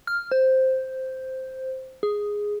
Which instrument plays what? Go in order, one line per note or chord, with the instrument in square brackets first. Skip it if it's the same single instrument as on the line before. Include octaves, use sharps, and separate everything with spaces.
[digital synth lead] F6
C5
G#4